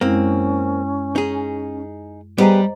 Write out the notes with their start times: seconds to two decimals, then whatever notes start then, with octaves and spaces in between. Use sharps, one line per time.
0.01 F#2 G#3 A#3 C4 C#4 E4
1.16 D#4 G#4
2.38 G3 B3 G4 G#4 C5 D#5 A#5